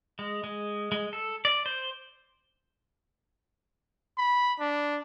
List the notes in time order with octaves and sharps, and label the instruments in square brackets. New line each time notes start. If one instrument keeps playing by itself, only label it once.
[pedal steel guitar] G#3
G#3
G#3
A4
D5
C5
[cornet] B5
D4